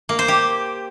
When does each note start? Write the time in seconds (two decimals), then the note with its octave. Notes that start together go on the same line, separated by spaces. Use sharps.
0.09 A#3
0.19 C5
0.28 G4